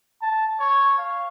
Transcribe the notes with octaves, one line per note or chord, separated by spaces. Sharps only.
A5
C#5
F5